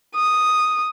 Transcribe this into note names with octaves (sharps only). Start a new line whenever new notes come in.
D#6